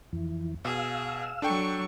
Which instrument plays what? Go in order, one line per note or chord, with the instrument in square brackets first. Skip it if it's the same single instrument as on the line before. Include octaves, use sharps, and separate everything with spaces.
[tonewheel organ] F2 E3
[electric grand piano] B2 [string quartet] G#4 [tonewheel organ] F5 E6
[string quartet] F#3 C#6 [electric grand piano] D4 A4 G5